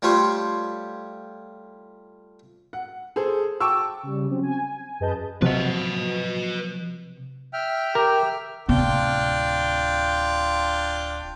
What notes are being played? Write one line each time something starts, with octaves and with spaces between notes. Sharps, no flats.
G3 A3 F4 C5 C#5
F#5
G#4 A4 C5
G5 A5 C#6 D6 E6
C#3 G3
F#3 C4 C#4
G#5
F#2 G#4 B4 D#5 A5 G6
C3 F3 F#3 B4 D#5
E5 G5 F6
G4 A#4
D1 C3 D4 F4 G5